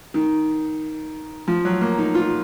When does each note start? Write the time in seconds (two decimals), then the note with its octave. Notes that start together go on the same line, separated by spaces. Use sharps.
0.14 D#3
1.48 F3
1.65 F#3
1.81 A#3
1.98 D#4
2.15 F4